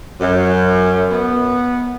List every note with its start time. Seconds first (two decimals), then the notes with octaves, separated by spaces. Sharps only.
0.21 F#2
1.11 B3